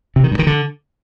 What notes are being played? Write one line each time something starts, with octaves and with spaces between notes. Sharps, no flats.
C3
D#3
G2
D#3
D3